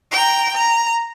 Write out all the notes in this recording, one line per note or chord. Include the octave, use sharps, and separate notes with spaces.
G5 A#5
A#5